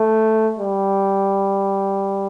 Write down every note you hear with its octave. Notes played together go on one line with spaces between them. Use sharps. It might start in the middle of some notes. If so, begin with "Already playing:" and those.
Already playing: A3
G3